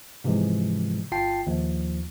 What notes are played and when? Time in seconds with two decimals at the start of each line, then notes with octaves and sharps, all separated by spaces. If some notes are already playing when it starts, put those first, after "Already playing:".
0.24 G#2 C3 E3 F3 G#3
1.12 G1 F4 G5 A5 C7
1.47 D#2 F3